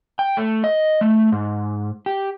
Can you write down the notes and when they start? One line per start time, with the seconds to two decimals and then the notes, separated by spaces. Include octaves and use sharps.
0.19 G5
0.37 A3
0.64 D#5
1.01 A3
1.32 G#2
2.06 G4